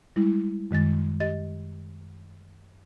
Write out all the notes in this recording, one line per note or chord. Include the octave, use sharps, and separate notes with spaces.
G3 G#3 E4
F#2 D#3 G#3 A6
G4 D#5 A6